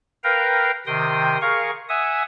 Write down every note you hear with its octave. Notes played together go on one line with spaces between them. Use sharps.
A#4 B4 F5 G5 A#5
C3 D#3 G5 C6 D#6
G#4 A#4 F5 C#6
E5 F#5 G#5 D#6